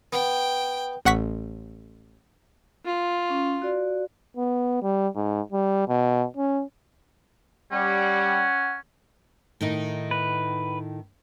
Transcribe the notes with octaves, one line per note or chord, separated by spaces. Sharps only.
B3 G5
A1 F#5 C#6 B6
F4
C#4
F#4 D5
B3
G3
G#2
G3
B2
C#4
G3 C#4 F#5
A2 D#3 D#4
B4